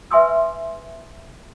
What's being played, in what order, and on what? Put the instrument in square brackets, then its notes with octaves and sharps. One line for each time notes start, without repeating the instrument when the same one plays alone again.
[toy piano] B4 E5 G#5 C6 D#6 E6